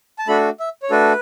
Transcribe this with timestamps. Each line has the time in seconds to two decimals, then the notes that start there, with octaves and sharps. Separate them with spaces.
0.19 A5
0.28 A3 D4 F#4 A4 B5
0.60 E5
0.82 C#5
0.90 A3 D4 F#4 A4 B4